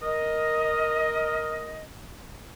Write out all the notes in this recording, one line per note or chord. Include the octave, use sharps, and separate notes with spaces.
A#4 D#5